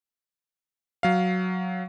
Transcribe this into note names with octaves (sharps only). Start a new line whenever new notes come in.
F#3 F5